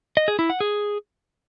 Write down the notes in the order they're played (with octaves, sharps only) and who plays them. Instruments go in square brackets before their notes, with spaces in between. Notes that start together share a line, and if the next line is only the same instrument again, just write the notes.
[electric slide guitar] D#5
G#4
E4
F#5
G#4